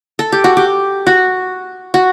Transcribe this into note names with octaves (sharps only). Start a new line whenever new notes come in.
A4
G4
F#4
G4
F#4
F#4